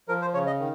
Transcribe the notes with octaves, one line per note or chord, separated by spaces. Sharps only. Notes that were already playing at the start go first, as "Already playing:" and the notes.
F3 A#4
C5
C#3 C#5
D#5
D#3